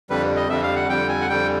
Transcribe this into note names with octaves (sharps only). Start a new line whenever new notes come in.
F2 D3 G3 B4
D#5
F2 D3 G3 E5
F5
F#5
F2 D3 G3 G5
G#5
F#5
F2 D3 G3 G5